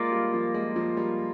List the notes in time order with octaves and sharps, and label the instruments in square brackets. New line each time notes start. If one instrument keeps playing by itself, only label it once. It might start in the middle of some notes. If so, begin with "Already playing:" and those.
Already playing: [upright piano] G#3 [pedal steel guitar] A#3 F4 A#4 D5
[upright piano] G3
F3
G#3
F3
G3